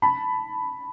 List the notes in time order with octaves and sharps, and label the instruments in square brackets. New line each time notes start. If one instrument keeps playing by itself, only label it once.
[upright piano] A5 B5